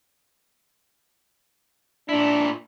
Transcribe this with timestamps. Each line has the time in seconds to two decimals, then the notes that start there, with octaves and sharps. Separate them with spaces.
2.09 A#2 D4 E4